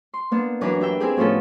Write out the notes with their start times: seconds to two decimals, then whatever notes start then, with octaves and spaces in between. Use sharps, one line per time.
0.14 C6
0.31 A#3 B3 D4
0.61 F#2 E3 D4 A#4 B4
0.80 D4 G4 E5 G5
1.00 C4 E4 G4 G#4
1.17 A2 F3 B3 C#4 F4 A4